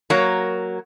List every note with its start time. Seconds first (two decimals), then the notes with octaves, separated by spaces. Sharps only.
0.10 F#3 A#3 A#4 C#5